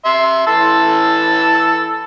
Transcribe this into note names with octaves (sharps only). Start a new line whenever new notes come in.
E5 C6
E3 A5 E6